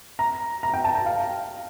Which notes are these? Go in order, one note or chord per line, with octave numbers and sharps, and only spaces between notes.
A#5
A#5
G5
A5
G5
F5